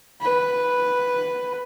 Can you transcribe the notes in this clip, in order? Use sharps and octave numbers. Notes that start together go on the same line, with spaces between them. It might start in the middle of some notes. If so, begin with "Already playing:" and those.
B4